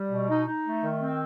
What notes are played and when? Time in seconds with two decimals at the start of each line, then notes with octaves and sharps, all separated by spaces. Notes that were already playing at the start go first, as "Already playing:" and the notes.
Already playing: G3
0.10 B2
0.29 D#4
0.47 D#4
0.66 A3
0.83 D#3
1.01 C4